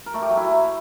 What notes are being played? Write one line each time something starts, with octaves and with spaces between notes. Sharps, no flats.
A#4
A3
G4
F#3
E4